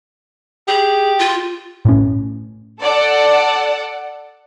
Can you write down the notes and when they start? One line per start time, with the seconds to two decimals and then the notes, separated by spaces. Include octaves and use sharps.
0.68 G4 G#4
1.19 F4
1.85 A2 C#4
2.80 A4 D5 F#5